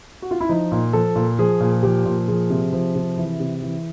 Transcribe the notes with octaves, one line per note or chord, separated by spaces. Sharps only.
F#4
F4
E4
F3 D#4
A#2
F3 A4
A#2
F3 G#4
A#2
F3 G4
A#2
F3 G#4
C3
F3
C3
E3
C3
E3